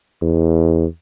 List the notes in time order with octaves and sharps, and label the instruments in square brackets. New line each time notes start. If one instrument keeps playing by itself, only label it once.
[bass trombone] E2